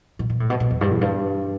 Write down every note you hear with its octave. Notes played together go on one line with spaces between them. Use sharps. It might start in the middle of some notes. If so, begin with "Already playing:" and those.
B2
B2
A2
B2
B2
E2
G2
E2
G2